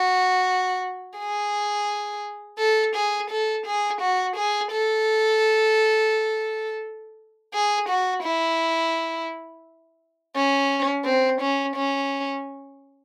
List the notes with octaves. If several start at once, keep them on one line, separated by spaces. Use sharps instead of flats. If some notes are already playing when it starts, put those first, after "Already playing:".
Already playing: F#4
G#4
A4
G#4
A4
G#4
F#4
G#4
A4
G#4
F#4
E4
C#4
C4
C#4
C#4